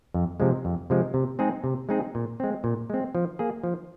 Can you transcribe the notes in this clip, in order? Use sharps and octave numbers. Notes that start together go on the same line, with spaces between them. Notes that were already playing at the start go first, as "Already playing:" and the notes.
F2
C3 F3 G#3
F2
C3 F3 G#3
C3
G#3 C4 D#4 G#4
C3
G#3 C4 D#4 G#4
A#2
G#3 C4
A#2
G#3 C4
F3
A#3 G#4
F3